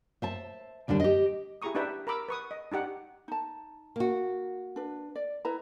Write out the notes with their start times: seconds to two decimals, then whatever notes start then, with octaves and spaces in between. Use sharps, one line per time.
0.22 C5 E5 A5
0.88 D#2 D3 G3 D4
1.00 G4 D#5
1.62 E4 G4 G#4 A#5 C#6 D#6
1.75 D4 D#4 G4 B4 E5 G5
2.07 A#4 A#5 B5 D6 E6
2.29 B4 C#6 D#6
2.51 D#5
2.72 D4 D#4 G4 F#5
3.28 D#4 A5
3.96 A#3 F#4
4.76 D4 B4
5.15 D5
5.45 E4 B4 A#5